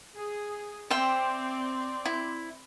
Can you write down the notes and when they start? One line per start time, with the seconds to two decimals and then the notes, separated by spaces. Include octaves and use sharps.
0.15 G#4
0.90 C4 C5 D5 E5 G5
2.05 E4